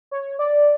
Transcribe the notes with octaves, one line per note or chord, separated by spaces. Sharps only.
C#5
D5